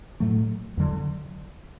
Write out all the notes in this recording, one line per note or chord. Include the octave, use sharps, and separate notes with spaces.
A2 F#3 A3
E2 D3 F#3